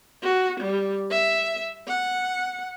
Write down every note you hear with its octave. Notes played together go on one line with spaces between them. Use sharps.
F#4
G3
E5
F#5